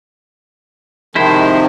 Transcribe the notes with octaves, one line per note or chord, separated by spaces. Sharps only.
C3 D#3 F3 G#3 E4 C5